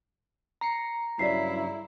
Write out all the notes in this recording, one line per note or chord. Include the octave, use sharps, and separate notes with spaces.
A#5 A#6 C7 C#7
G2 C#3 F#3 E4 D5 B6 C7